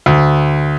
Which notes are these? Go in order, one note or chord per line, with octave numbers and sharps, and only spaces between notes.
D2